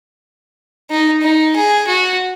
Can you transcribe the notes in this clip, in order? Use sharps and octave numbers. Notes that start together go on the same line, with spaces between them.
D#4
D#4
G#4
F#4